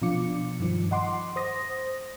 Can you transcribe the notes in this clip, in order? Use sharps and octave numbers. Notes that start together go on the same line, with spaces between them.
B2 F3 D4 F4 D6 C#7
G2 D#3 F3
D#5 F#5 C6 D6
C5 D#6 A#6